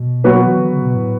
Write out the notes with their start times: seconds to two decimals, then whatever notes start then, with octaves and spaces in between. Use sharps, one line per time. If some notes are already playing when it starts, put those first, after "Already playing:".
Already playing: B2
0.24 F#3 B3 F#4 B4
0.46 E3
0.58 D3
0.70 C#3
0.82 B2
0.94 A2